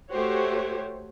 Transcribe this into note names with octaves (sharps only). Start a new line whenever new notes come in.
A3 F#4 G4 C5 C#5